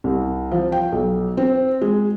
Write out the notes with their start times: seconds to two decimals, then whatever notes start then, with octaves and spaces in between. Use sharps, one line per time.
0.04 C2
0.51 F3
0.72 G5
0.92 B1
1.37 C4
1.81 G#3